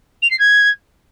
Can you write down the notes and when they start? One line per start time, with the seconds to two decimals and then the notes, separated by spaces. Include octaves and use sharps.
0.22 F7
0.31 C7
0.39 G#6